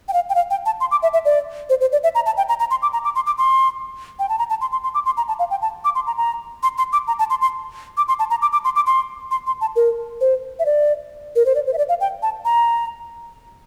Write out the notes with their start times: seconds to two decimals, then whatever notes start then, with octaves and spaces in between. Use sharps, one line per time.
0.08 G5
0.13 F5
0.29 G5
0.35 F5
0.50 G5
0.66 A5
0.80 C6
0.91 D6
1.03 E5
1.13 E5
1.25 D5
1.70 C5
1.81 C5
1.92 D5
2.04 E5
2.15 A#5
2.26 A5
2.37 G5
2.49 A#5
2.60 A#5
2.71 C6
2.82 D6
2.93 A#5
3.04 D6
3.15 C6
3.27 D6
3.38 C6
4.19 G5
4.29 A5
4.39 A#5
4.50 A5
4.61 C6
4.72 C6
4.84 C6
4.94 D6
5.06 C6
5.17 A#5
5.28 A5
5.39 F5
5.51 G5
5.62 A5
5.85 D6
5.95 C6
6.07 A#5
6.17 A#5
6.63 C6
6.78 C6
6.93 D6
7.07 A#5
7.19 A5
7.30 C6
7.41 C6
7.97 D6
8.08 C6
8.19 A5
8.30 A#5
8.42 D6
8.53 D6
8.65 C6
8.76 D6
8.86 C6
9.31 C6
9.47 C6
9.61 A5
9.76 A#4
10.21 C5
10.59 E5
10.66 D5
11.36 A#4
11.46 C5
11.55 D5
11.67 C5
11.73 E5
11.78 D5
11.89 F5
12.01 G5
12.23 A5
12.45 A#5